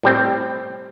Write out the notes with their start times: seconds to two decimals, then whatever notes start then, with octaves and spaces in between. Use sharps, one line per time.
0.03 A2 G3 C4